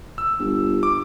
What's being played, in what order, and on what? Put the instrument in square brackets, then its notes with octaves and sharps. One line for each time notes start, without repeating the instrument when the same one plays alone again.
[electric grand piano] E6
[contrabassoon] G1
[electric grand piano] D6